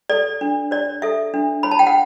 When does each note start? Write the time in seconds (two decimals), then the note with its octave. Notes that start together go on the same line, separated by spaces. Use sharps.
0.09 A4 D5
0.41 D4
0.71 C#5 D5
1.02 A4 E5
1.34 D4
1.63 C#5 B5
1.71 A5
1.79 G5
1.87 F#5